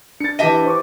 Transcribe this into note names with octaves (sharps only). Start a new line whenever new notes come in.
D4 A6 C#7
E3 G4 D#5 E5 A5 D#7
C5 C#6 D6